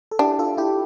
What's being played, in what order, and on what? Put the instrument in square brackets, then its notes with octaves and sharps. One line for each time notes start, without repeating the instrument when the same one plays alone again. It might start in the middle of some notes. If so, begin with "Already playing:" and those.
[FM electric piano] A4
[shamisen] D4 [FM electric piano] E4 G4
[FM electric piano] F4 A4
E4 G4